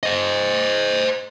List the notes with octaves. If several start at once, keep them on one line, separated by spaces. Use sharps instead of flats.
C5 D#5